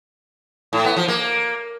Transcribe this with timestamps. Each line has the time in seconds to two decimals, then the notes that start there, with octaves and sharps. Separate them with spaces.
0.73 A2
0.85 B3
0.96 F3
1.08 A#3